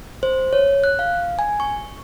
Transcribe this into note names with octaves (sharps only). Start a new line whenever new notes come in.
C5
C#5
F#6
F5
G#5
C#6